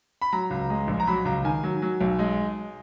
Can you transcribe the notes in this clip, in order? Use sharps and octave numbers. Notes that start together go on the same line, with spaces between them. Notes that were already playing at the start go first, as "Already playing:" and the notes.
B5
F#3 A#5
C#2
G#3
A#1
A#5
F#3 B5
C#2 A#5
D#3 G#5
F#3
F#3
B1
G#3